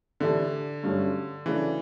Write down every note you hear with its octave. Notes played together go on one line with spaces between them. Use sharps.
A2 D3 E3 A3 D4 G4
G2 F#3 A3 C#4
C#3 E3 F#3 A3 D4